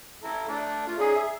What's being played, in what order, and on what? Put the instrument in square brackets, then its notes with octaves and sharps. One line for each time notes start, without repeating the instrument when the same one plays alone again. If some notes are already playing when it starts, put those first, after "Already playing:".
[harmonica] E4 A4 A#5
A3 D4 D5
A3 F4
[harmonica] C#4 D#4 D5 [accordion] G#4
[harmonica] E5